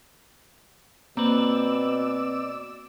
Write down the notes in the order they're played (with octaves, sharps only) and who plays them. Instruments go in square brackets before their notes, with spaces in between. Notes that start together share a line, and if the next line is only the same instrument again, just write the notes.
[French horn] B2 [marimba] A#3 [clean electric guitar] C4 B4 [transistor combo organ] D5 E6